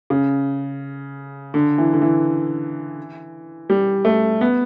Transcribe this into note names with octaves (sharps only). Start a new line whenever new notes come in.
C#3
D3
E3
D3
E3
G3
A3
B3